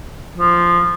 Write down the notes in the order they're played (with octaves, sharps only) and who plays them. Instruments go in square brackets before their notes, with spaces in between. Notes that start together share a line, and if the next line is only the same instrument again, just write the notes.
[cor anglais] F3